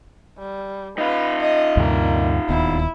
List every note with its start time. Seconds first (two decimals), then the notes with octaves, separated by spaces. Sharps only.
0.38 G3
0.98 D#4 F4 B4
1.41 D#5
1.77 D2 G2 C3 A#3
2.49 D1 D#2 B3 E4